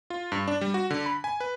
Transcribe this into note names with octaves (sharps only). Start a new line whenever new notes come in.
F4
G2
D4
G3
F#4
D3
B5
G#5
B4